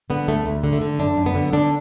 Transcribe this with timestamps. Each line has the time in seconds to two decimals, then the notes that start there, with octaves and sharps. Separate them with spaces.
0.10 D3 B3
0.28 D2 A3
0.46 D2
0.64 D3
0.73 A3
0.81 D3
0.99 F#2 D4
1.17 F#2
1.26 B3
1.35 D3
1.53 D3 D4